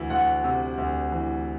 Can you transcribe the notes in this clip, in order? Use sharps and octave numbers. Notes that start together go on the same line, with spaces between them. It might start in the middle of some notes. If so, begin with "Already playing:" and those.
Already playing: D2 E3
D2 F#5
C3
D2
E3